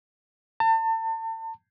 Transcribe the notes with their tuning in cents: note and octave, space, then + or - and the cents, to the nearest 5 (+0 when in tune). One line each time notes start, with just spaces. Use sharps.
A5 +35